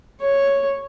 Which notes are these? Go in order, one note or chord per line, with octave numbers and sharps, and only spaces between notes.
C#5